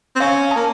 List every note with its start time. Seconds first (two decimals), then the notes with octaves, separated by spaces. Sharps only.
0.16 C4
0.20 C#4 F5
0.51 A#3 A5